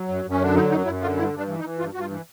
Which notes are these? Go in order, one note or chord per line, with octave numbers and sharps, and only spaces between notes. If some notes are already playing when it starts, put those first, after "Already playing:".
Already playing: F#3
F#2
F#2
C#4
D3 D4
F#3 D#4
F#2 D#4
F#2 E4
D3 F4
G2 E4
G2 D4
E3
D#4
E3
G2 F4
G2 F#4
F4
E3